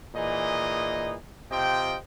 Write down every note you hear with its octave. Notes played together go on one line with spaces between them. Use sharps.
A#2 E3 D#4 G#4 D#5
C3 F4 D#5 G5